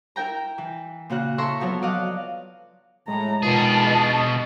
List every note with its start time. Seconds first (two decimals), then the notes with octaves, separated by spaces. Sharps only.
0.16 E4 A#4 G5 A#5
0.58 E3
1.10 A#2 C#3 F#4 F#6
1.38 E4 A4 E5 A#5 C6 C#6
1.60 F3 F#3 B3 C#5
1.82 F#3 D5 D#5 F5 F#6
3.08 A2 G#3 A#5
3.42 B2 D#3 F4 G#4 B4 A5
3.87 D#5